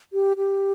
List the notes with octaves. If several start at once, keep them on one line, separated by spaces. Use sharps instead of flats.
G4
G4